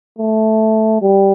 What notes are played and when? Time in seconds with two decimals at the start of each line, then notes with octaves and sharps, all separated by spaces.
0.19 A3
1.02 G3